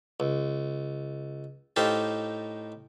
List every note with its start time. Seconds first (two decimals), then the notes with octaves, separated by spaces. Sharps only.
0.20 C#2
1.76 A2 D#4 G4 A4 C5 F5